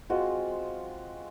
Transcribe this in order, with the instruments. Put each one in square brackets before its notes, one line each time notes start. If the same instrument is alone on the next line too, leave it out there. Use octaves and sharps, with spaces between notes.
[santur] G#3 C4 F4 [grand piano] F#4